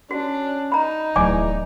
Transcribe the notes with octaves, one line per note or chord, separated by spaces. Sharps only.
C#4 D4 F#4
D#4 A#5 B5
D1 E2 F#3 D5 G#5 D6